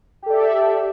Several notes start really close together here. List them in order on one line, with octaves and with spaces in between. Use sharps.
G4 A4 D5 E5